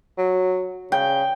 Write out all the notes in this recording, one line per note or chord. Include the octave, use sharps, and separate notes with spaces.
F#3
C#3 G5